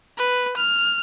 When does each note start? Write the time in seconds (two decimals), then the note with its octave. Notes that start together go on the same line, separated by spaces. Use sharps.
0.18 B4
0.57 F6